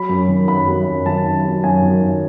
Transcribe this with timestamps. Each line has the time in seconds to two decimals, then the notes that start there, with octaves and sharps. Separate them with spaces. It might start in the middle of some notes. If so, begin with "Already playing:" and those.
Already playing: F#3 B5
0.09 F#2
0.28 D#3
0.48 F#2 B5
0.68 F#3
0.87 F#2
1.06 D#3 A5
1.25 F#2
1.45 F#3
1.64 F#2 G#5
1.83 D#3
2.03 F#2